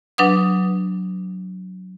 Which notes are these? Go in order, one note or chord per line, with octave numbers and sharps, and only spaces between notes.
F#3 D4 B4 F#5 D#6